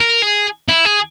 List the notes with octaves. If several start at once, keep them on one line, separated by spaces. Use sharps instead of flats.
A#4
G#4
E4
G#4